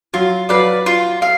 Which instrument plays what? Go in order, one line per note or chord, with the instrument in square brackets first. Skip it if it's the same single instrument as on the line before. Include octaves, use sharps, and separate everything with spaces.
[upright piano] F#3 [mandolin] F4
[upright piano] F#3 [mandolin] B4 D5 F5
[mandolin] F4
F5